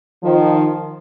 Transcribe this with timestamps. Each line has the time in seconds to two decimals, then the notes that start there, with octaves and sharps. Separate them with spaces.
0.23 D#3 F3